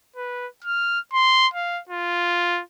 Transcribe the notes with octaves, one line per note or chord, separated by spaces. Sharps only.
B4
F6
C6
F5
F4